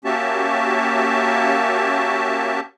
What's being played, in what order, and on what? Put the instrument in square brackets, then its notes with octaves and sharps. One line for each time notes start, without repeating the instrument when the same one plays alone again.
[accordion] A#3 C#4 F#4 G4 E5 A5